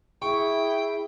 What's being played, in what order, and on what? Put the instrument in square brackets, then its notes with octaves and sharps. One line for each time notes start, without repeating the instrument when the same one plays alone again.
[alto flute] E4 [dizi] G#4 [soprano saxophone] G5 [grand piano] C#6